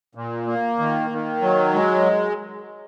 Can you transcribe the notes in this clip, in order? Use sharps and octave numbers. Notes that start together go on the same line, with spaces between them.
A#2
A#3
D#3
D#3
F#3
G#3